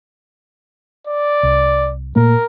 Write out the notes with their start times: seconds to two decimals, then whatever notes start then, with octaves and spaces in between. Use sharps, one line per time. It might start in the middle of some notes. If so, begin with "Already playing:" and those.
1.07 D5
1.43 C2
2.16 A#2 A3 A#3 A#4